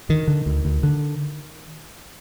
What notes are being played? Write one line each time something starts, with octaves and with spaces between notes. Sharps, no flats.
D3 D#3
D3
D2
D2
D3